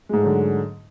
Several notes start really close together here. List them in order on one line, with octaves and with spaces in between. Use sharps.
G#3 G#2 A3 F#3 D3